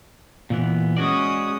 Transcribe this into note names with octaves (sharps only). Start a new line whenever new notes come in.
A#2 E3 B3
G#3 C#4 F#4 D5 D#6